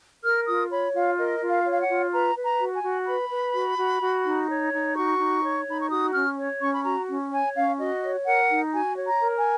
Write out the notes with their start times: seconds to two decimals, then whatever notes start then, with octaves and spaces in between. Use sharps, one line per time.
0.23 A#4 F6
0.47 F4 D#6
0.70 C#5 B5
0.94 F4 F5
1.18 A#4 D#5
1.41 F4
1.49 F5
1.65 C#5
1.72 F5
1.81 F#5
1.89 F4
2.12 B4 A#5
2.36 B4
2.44 A#5
2.60 F#4
2.75 G#5
2.84 F#4
3.07 B4 B5
3.30 B4
3.54 F#4
3.78 F#4
4.02 F#4
4.25 D#4
4.49 C#5
4.72 D#4
4.96 F#4 C#6
5.19 D#4
5.43 C#5
5.67 D#4 B5
5.80 C#6
5.90 F#4 D#6
6.14 C#4 F6
6.38 C#5
6.61 C#4 C#6
6.73 B5
6.84 F#4 A#5
7.08 C#4
7.32 C#5 G#5
7.55 C#4 F5
7.79 F#4 D#5
8.03 C#5
8.26 A#4 F#5
8.50 D#4
8.73 F#4 G#5
8.98 C#5
9.05 A#5
9.21 A#4
9.37 G#5